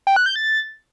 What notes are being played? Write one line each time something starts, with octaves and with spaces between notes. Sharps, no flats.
G5
F#6
G6
A6